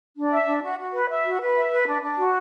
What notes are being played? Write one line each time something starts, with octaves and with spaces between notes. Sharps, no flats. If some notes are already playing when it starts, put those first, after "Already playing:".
D4
E5
D4
F#4
F#4
B4
E5
F#4
B4
E5
B4
D4
D4
F#4